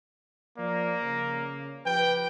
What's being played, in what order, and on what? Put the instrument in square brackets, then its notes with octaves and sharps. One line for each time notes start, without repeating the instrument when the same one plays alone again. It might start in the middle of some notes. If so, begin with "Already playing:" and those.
[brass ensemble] F3 D5 [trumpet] A#3
[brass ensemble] C#3
[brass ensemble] F3 G4 B4 [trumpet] G5